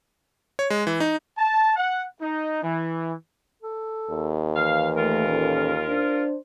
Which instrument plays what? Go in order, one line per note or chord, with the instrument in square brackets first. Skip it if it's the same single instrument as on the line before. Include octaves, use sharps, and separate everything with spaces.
[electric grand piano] C#5
G#3
E3
D#4
[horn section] A5
F#5
D#4
E3
[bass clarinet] A4
[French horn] D#2
[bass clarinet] E3 [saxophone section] F5
[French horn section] A3 [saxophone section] F4 A#4
[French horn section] A#2 C#4 A4
D4 C5